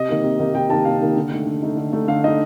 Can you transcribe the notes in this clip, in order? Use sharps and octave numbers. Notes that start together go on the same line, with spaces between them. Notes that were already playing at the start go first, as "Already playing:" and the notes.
Already playing: C3 D#5
D#3 A#3 D#4
C3
D#3 A#3 D#4
C3 G5
D#3 A#3 D#4 A5
C3 F5
D#3 A#3 D#4
D3
A3 D#4
D3
A3 D#4
D3
A3 D#4
D3 F5
A3 D#4 D#5